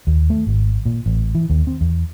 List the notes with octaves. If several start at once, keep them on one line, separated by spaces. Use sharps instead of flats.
D#2
A3
G#1
A#2
A1
E3
D#2
C4
E2